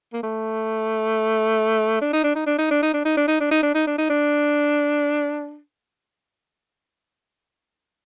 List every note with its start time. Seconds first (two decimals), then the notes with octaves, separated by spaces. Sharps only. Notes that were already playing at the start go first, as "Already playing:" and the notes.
0.13 A#3
0.23 A3
2.01 D4
2.13 D#4
2.24 D4
2.35 D#4
2.47 D4
2.58 D#4
2.71 D4
2.83 D#4
2.94 D4
3.05 D#4
3.17 D4
3.28 D#4
3.40 D4
3.51 D#4
3.63 D4
3.75 D#4
3.87 D4
3.98 D#4
4.10 D4